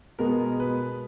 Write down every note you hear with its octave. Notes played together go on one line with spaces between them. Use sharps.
B2 G#3 B3 A#4
B4